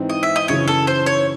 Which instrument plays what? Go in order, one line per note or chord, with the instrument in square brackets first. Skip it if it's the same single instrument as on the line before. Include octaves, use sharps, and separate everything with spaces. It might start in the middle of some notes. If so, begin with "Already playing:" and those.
Already playing: [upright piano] G#2 E3 C4 D#4
[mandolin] D#5
E5
D#5
[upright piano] F#2 C#3 E3 [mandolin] C#5
[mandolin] A4
C5
C#5